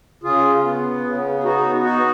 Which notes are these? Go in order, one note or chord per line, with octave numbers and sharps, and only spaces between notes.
C#3 F4 G#4
B3
C#3
G#4
B3 D#4 F#4
D#4 F#4